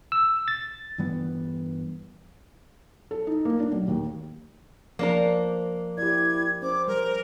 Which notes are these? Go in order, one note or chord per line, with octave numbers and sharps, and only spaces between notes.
E6
A6
G2 E3 G3 B3
A4
D#4
A#3
D4
B1
D#2
F3 A#3 D4 A#4 C5
E4 G4 D5 G#6
C#4 C5 D6
G3 A#4